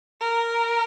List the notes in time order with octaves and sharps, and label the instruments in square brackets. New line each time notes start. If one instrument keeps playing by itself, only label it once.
[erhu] A#4